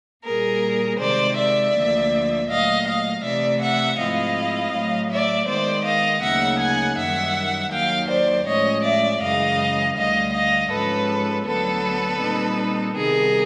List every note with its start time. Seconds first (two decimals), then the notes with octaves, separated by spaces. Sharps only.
0.24 A#2 G3 A#3 G#4 A#4
0.98 C3 D#3 G#3 C5 D5
1.36 D5 E5
1.74 D2 D3 F3 A#3
2.48 A#2 F#3 A3 D#5 F5
2.85 D#5 F5
3.23 C3 E3 A3 D5 E5
3.61 E5 F#5
3.98 G#2 F3 A3 C4 E4 D#5 F5
4.73 A2 F#3 A3
5.10 D5 E5
5.47 D#3 G#3 B3 C5 D5
5.85 D#5 F5
6.22 D2 C#3 F#3 A#3 D#4 E5 F#5
6.59 F#5 G#5
6.97 F#2 D#3 G3 E5 F#5
7.71 D#2 D#3 F#3 F5 G5
8.08 C5 D5
8.46 A2 F3 G#3 C#4 C#5 D#5
8.83 D5 E5
9.21 F#2 C#3 E3 G#3 D#5 F5
9.96 D2 D3 G3 D#5 F5
10.33 D#5 F5
10.70 G#2 F3 G#3 C#4 A4 B4
11.45 D2 D3 F#3 B3 A4 B4
12.20 A#2 G3 C4 D#4
12.94 C3 D#3 G3 B3 G#4 A#4